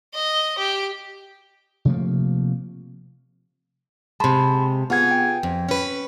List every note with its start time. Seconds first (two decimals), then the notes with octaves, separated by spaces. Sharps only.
0.14 D#5
0.58 G4
1.85 C3 F3 A3 A#3
4.20 C3 G#3 A5 B5 C6
4.90 B3 F4 G#4 F#5 G#6
5.11 G5
5.43 F2
5.69 C#4 B4